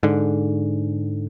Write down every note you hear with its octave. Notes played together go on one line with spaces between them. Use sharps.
G#2 D3